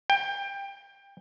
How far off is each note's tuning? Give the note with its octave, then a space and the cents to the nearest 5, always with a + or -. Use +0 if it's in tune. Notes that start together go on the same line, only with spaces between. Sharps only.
G5 +20